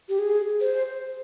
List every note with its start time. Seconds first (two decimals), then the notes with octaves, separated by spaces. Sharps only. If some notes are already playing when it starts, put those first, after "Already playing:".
0.09 G4
0.19 G#4
0.61 C5